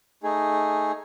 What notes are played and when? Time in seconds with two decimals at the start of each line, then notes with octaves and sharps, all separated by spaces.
0.23 A3 D#4 G#4